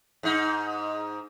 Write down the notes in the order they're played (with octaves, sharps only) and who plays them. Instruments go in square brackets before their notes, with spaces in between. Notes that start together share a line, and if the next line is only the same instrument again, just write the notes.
[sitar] G#2 D#4